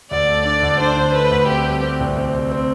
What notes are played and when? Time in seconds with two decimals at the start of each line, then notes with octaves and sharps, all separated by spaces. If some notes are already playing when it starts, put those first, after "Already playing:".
0.11 D2 D5
0.28 A3
0.45 D4 D5
0.62 D2
0.80 D4 C5
0.97 D3
1.14 A3 B4
1.31 D2
1.48 C4 G4
1.66 G3
1.83 C4
2.00 C2
2.17 C4
2.34 C4
2.52 C4